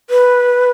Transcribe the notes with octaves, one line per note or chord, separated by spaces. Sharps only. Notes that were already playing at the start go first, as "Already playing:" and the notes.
B4